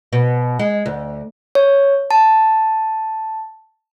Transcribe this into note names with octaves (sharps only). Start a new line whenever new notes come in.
B2
G#3
D2
C#5
A5